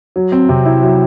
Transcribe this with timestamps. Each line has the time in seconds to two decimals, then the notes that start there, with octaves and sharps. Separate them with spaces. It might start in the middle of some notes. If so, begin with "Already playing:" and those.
0.16 F#3
0.32 C4
0.49 C3
0.66 E4
0.82 F#3